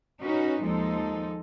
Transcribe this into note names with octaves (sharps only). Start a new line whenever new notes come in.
C#4 D#4 F#4 B4
D#2 F3 G#3 D#4 A4